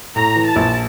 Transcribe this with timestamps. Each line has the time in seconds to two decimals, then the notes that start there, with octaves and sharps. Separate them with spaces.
0.15 A2 A#5
0.36 E3
0.46 A5
0.56 A#1